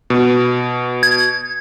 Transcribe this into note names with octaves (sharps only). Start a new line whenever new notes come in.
B2
G#6